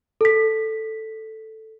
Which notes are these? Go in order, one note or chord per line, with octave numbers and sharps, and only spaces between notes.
A4 B6